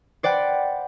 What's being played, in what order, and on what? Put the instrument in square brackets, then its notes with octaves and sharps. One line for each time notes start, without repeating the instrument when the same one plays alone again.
[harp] C5 D5 F#5 G5 B5